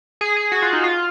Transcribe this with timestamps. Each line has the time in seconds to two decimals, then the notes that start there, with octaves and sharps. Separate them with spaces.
0.21 G#4
0.37 G#4
0.52 F#4
0.62 F4
0.73 D#4
0.84 F4